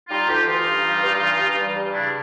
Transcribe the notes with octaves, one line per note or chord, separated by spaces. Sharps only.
G3 D#4 F4
D2 F4 G4
E3 D#4 F4
G2
G3
G2
E3
G2
G3
G2
C#3 D4 E4